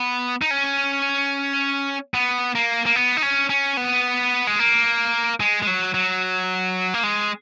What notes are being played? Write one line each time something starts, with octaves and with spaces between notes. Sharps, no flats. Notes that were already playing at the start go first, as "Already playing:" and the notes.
Already playing: B3
D#4
C#4
B3
A#3
A#3
B3
D#4
C#4
C#4
B3
G#3
A#3
G#3
G#3
F#3
F#3
A#3
G#3